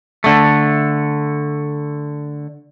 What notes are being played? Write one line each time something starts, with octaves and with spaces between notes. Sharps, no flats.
D3 A3